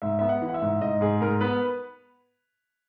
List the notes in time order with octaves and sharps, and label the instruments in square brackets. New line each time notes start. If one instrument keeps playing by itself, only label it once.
[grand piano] G#2 E5
B3 E5
F#5
E3
F#5
E5
G#2
G#2 D#5
G#2 G#4
G#2 A#4
B3 B4